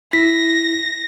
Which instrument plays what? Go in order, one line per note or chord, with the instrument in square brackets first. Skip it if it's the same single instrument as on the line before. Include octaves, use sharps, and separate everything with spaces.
[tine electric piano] E4 [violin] A#6 [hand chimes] B6